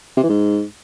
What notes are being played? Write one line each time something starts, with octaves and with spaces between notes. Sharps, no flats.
C3
E3
G#2